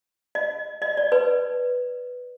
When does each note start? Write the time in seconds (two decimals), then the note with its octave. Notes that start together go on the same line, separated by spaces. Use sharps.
0.35 D#5
0.82 D#5
0.97 D5
1.12 B4